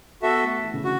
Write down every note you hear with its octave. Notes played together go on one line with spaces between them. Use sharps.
B3 F#4 A4 E5
A3
E3
C#3
D3 F#4